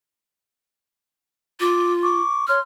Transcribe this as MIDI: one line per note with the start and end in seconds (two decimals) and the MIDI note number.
1.60 2.20 65
1.60 1.90 86
2.02 2.46 85
2.02 2.46 86
2.47 2.59 73
2.47 2.59 84
2.47 2.60 89